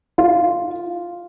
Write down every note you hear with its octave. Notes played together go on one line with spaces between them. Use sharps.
F4